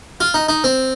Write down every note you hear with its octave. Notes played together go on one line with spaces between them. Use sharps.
F4
D#4
D#4
C4